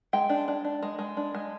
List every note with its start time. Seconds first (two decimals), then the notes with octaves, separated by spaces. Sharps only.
0.13 G#3 G5
0.30 D4
0.48 D4
0.65 D4
0.83 G#3
0.99 G#3
1.17 D4
1.35 G#3